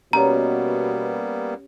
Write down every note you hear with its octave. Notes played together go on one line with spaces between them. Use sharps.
B2 G3 A#3 B3 C#4 G4 C#5 A#5